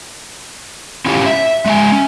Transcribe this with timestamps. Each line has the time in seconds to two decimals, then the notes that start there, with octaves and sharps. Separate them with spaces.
1.06 C#4 E4 F4 G4 C#5
1.26 E5
1.66 G#3 E5 G#5
1.92 C#4